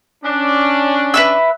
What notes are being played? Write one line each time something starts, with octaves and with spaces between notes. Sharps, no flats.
C#4 D4
B4 E5 E6